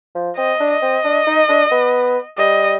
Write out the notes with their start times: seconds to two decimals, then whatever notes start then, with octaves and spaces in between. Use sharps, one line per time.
0.15 F3
0.37 C4 D#5
0.60 D4
0.71 D#5
0.82 C4
1.04 D4
1.27 D#4
1.49 D4
1.71 B3
2.37 G3 D#5